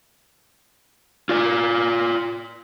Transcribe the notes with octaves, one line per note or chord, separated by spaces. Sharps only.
F4 D5